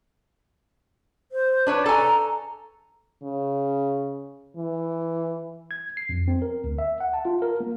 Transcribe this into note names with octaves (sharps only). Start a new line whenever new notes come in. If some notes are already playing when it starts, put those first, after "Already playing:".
C5
D4 B4 C#5
A4 G#5 A#5
C#3
E3
G#6
C7
F2
C4
A#4
D2
E5
F#5
A5
F4
A#4
A#3